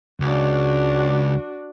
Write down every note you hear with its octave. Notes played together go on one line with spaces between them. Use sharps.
C#2 D4 F#4